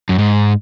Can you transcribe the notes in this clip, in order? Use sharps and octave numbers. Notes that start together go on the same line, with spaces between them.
F#2
G#2